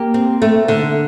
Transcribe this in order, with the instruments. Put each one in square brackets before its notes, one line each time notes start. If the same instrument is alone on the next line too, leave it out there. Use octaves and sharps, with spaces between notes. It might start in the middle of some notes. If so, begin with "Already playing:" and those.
Already playing: [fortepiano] A#3 [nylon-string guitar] G4
[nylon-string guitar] C4
A3
D3